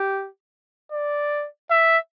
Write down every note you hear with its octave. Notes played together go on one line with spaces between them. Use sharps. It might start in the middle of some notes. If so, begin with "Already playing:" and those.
Already playing: G4
D5
E5